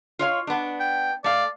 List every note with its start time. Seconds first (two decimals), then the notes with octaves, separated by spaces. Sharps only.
0.19 F4 C#5 F5
0.47 B3 D4
0.80 G5
1.24 A3 D5 F5